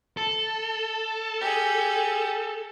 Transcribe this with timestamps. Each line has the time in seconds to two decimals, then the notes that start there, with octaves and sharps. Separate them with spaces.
0.17 A4
1.41 G4 G#4